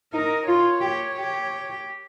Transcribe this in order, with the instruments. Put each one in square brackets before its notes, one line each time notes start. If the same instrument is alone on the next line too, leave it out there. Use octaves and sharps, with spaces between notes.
[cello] D#4 [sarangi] A#4
[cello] F4 [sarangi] C#5
[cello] G4
G4